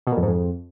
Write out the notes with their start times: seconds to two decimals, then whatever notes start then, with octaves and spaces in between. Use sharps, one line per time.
0.07 B2
0.12 A#2
0.17 F2
0.23 G#2
0.28 F2